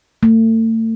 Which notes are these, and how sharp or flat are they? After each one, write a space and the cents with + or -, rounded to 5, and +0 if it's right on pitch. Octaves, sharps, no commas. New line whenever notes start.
A3 +35